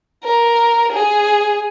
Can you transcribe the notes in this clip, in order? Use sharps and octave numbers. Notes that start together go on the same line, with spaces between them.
A#4
G#4